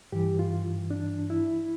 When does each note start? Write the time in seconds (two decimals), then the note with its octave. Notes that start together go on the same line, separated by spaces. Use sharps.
0.12 G2 E3 G4
0.39 F4
0.91 D4
1.30 E4